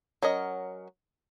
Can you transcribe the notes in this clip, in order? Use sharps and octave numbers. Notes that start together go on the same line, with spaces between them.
F#3 C#4 A#4 D#5